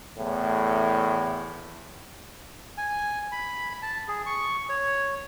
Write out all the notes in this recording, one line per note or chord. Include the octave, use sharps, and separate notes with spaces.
E2 A2 A3
G#5
B5
A5
G#4
C#6
C#5